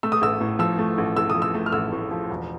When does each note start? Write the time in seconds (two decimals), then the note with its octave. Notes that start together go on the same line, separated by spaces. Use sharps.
0.03 A3 E6
0.12 D#6
0.22 A1 E6
0.40 A2
0.59 F3 E6
0.78 A3
0.98 A1
1.16 A2 E6
1.30 F3 D#6
1.42 E6
1.55 A3
1.66 F6
1.72 A1 E6
1.92 A2
2.11 F3
2.30 E1